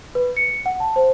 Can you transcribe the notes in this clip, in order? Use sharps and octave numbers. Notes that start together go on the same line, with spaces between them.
B4
C#7
F#5
A5
C5